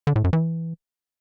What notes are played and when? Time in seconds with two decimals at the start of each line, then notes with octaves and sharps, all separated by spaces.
0.07 D3
0.16 A2
0.24 F#2
0.33 E3